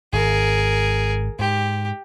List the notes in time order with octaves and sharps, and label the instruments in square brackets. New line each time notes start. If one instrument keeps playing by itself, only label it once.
[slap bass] G#1 [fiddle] G#4 A#4
[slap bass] G#2 [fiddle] G4